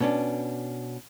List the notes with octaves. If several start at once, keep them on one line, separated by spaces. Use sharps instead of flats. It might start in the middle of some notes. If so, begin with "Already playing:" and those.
B2 C#4 D4